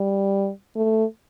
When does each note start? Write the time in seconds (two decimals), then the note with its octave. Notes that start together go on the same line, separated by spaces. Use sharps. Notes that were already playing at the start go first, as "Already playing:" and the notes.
Already playing: G3
0.76 A3